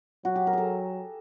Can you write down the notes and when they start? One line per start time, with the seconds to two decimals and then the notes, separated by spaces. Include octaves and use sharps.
0.25 F#3 F#4
0.36 G4
0.47 A#4
0.53 G#4 A4